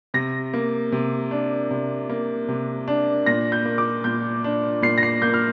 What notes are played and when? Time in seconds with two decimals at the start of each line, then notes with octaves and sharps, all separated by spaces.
0.14 C3 A#6
0.53 A#3
0.92 C3
1.31 D4
1.71 C3
2.09 A#3
2.48 C3
2.88 D4
3.26 A#2 A#6
3.52 G6
3.65 A#3
3.78 D6
4.04 A#2 G6
4.44 D4
4.82 A#2 C7
4.98 A#6
5.03 C7
5.22 A#3 G6
5.34 F6